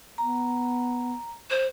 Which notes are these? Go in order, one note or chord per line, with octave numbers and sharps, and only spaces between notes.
B3 A#5
C5